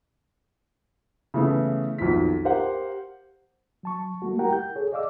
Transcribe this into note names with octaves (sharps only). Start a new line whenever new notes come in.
C#3 E3 A3 B3
B1 F2 D#3 B6
G4 A#4 C5 F5 F#5
F#3 A5 C#6
G3 A3 A#3 F#4
E4 G4 A#4 F#5 G5 A#5
G6
G#4 A4 C#5
D5 D#5 F5 D6 E6